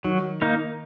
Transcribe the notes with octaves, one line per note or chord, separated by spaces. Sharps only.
D#3 F#3
A#3 D#4 A#4